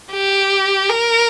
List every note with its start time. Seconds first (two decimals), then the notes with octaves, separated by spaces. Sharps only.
0.12 G4
0.89 A#4